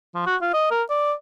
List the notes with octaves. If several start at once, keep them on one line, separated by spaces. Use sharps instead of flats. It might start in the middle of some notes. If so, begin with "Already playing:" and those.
F3
F#4
F4
D#5
A#4
D5